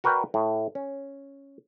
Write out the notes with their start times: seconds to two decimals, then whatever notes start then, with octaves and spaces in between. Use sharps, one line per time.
0.04 F#4 A#4 B4 D5 G5
0.34 A2
0.75 C#4